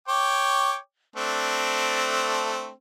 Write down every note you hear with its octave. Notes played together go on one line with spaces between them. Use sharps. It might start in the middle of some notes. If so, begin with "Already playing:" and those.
C#5 G5 D6
A3 C4 D4